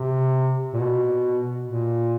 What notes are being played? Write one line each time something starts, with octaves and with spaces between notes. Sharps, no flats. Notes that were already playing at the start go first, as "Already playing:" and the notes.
Already playing: C3
A#2
B2
A#2